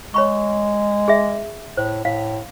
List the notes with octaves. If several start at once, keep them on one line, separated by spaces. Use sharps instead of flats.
G#3 C#5 B5 C#6
G#4 E5
A2 C5
A2 F5